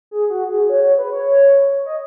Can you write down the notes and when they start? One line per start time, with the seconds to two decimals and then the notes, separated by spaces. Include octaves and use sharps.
0.11 G#4
0.30 F#4
0.50 G#4
0.69 C#5
0.84 C#5
0.98 B4
1.13 C#5
1.86 D#5